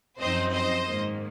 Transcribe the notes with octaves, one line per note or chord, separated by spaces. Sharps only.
F#2 F3 C4 D#4 C5 D#5
C5 D#5
G#2 D#3 A#3